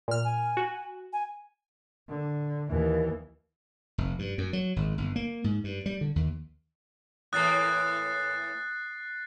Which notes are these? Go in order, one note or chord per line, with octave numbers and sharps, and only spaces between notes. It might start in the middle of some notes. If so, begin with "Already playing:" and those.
A#2 F6
G#5
F#4
G#5
D3
D#2 E3
F1
G2
F#2
F#3
G#1
G1
A#3
G#2
G2
G3
D3
D#2
A2 E3 A#3 D#6 F#6 A6 C7